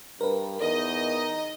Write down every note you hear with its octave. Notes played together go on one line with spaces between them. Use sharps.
G2 A#4 B4
E2 D#4 A#4 D#5